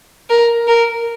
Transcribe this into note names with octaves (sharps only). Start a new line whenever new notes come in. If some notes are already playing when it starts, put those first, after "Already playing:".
A#4
A#4